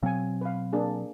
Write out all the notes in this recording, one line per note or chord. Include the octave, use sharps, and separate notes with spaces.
B2 F#3 C4 F5 G#5
B4 F5
A#3 D4 G#4